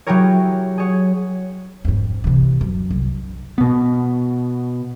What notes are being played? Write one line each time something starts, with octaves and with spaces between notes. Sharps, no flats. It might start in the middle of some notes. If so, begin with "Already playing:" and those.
F#3 E4 G4 G#4 A#4 C#5
G#4 C#5 F#5
F2 G#2
C3 E3
F#2
C2
B2 B3